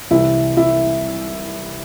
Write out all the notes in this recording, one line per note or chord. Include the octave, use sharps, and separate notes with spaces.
C2 C3 E3 E4
E4